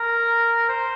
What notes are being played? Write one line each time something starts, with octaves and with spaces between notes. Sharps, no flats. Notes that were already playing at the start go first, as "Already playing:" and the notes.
Already playing: A#4
C5